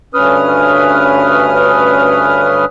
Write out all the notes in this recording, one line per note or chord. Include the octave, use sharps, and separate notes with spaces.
D2 G2 C#4 B4 D#6 F6